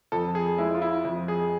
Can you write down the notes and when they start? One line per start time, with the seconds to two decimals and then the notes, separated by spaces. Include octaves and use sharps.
0.12 F2 A4
0.35 G#4
0.58 G#3 E4
0.75 F4
0.82 E4
1.05 F2
1.28 G#4